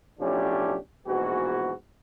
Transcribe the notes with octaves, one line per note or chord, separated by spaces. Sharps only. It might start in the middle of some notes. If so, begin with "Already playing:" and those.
B1 A2 F3 C#4 D4 G4
A#1 G#2 B2 E3 F#4